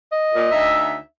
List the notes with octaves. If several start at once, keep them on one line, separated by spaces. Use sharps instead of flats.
D#5
A#2
D2 D#4 E5